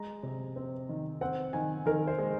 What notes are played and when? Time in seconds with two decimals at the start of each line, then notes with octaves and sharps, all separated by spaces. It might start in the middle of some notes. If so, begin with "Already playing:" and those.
Already playing: G#3 A#5
0.23 C3
0.56 C4
0.89 D#3
1.21 C4 F#5
1.53 D#3 G#5
1.86 D#3 A#4
2.07 C5
2.18 G#3